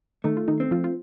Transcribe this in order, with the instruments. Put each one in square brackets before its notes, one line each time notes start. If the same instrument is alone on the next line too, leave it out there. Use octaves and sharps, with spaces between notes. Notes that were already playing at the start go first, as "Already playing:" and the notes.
[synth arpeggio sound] D#3 D#4 [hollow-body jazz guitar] A3
[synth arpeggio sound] F4
D#3 D#4
[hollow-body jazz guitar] C4
[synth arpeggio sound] F3 F4
F4